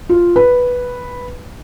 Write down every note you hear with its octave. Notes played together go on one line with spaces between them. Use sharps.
F4
B4